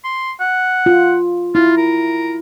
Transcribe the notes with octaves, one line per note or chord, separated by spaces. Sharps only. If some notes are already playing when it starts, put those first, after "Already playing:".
C6
F#5
F4
E4 F4
A#4